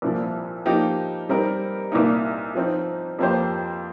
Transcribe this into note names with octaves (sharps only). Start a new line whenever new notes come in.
C2 A#2 F3
F3 A#3 D#4 G4
G3 C4 D#4 A#4
C2 A#2 A#3 D#4
F3 C4 D#4
F2 F3 A#3 G4 C5